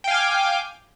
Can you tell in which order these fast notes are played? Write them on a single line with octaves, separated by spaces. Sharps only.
G5 F5 G#5 D6